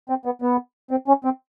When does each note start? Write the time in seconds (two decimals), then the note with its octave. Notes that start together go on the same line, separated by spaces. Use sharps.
0.10 C4
0.25 B3
0.42 B3
0.91 C4
1.08 C#4
1.25 C4